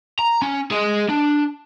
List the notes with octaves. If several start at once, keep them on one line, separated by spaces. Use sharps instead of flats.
A#5
C#4
G#4 D#5
D4